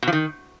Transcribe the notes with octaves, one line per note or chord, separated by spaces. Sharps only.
B2
F3
D#3